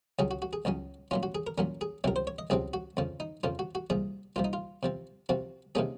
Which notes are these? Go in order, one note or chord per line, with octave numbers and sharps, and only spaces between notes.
C#2 C#3 F#3 C#4 G#4
F#4
F#4
G#4
C#2 C#3 F#3 C#4
A#2 F#3 C#4 F4
F#4
G#4
A#4
A#2 F#3 C#4 A#4
G#4
C#2 C3 F#3 C4 A#4
C5
C#5
D#5
C#2 C3 F#3 C4 G#4
F#4
F2 C#3 F3
D#4
F2 C#3 F3 F4
F#4
F#4
C2 A#2 F3 G#4
C2 A#2 F3 F4
D#4
F4
C3 F3 C4
C3 F3 C4 F#4
C3 D#3 A#3 C#4 G#4